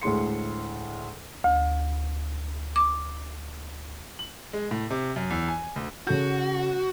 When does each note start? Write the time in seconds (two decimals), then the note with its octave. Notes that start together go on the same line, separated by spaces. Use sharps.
0.02 D2 A2 G#3 C6 C#7
1.44 D2
2.76 D6
4.19 F#7
4.53 G#3
4.71 A2
4.90 C3
5.16 F#2
5.30 E2
5.48 G#5
5.76 D2
6.07 C#3 F#4 A4 G6